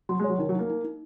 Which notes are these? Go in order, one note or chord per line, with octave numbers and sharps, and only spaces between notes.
F#3 C6
G#3
C#5
F#3
D#3 D#4
F#3
A#3 D#4
D#4
D#4